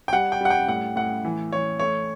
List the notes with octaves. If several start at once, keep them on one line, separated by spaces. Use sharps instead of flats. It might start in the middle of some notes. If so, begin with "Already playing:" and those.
G5
G3 F#5
G5
G3 F#5
G5
A2 F#5
A2 F#5
E3
E3 C#5
A3 C#5